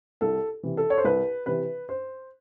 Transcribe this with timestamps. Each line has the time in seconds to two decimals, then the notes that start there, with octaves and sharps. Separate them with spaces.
0.21 C2 A4
0.63 C3 E3
0.77 A4
0.90 C#5
0.98 C5
1.04 C2 B4
1.46 C3 E3 B4
1.89 C5